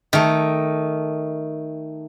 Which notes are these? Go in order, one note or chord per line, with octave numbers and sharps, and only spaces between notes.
D#3 A3